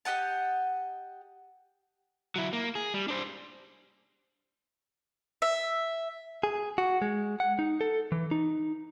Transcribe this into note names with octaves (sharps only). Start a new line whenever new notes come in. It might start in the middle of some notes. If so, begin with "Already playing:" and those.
G4 D#5 F#5 A5
F#3 E4
A#3
G#4
G3
D4 C5
E5
G#4
F#4
G#3
F#5
D#4
A4
E3
D#4